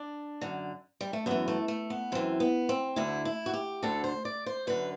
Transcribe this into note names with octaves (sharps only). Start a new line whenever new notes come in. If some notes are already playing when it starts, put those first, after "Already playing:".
Already playing: D4
F#2 D3
G3
A3
F#2 E3 B3
A3
A3
B3
F#2 E3 C4
B3
C4
D2 D3 E4
E4
F#4
G4
D2 D3 A4
C5
D5
C5
F#2 D3 B4